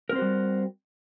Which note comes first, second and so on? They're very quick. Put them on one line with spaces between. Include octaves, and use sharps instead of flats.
A#4 C4 C5 F#4 G3